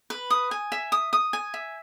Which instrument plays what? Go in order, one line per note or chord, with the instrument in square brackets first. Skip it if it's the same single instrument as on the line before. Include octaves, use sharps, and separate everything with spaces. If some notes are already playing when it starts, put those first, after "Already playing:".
[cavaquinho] B4
D#6
G#5
E5
D#6
D#6
G#5
E5